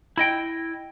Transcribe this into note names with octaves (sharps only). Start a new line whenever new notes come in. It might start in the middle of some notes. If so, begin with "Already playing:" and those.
E4 D#5 G5